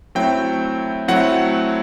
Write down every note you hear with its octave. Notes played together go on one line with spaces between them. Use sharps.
F#3 A3 C4 E4 G5
F#3 A3 C4 E4 F#5